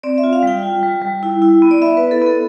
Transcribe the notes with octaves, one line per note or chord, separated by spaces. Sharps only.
C4 D5
E5
F4
F5
G3 G5
F4
G3
G3
E4
E4
B3
D5
B3 E5
E4 B4
A4
B3 A4